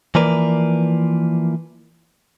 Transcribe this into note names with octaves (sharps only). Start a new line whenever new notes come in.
E3 F3 A#3 A#4 B4 D5